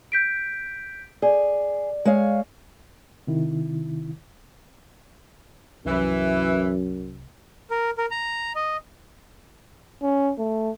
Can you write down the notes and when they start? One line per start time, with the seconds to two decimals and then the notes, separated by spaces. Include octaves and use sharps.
0.12 G6 B6 D7
1.22 G#4 D5
2.05 G#3 C#5 F5
3.27 C3 D#3 E4
5.86 C2 F#2 E3
7.70 A#4
7.98 A#4
8.11 A#5
8.55 D#5
10.03 C#4
10.39 A3